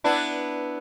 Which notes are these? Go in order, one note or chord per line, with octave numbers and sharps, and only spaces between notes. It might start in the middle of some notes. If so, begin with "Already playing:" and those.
B3 D4 E4